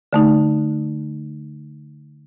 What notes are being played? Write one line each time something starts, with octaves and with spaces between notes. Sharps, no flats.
D3 A3 D#4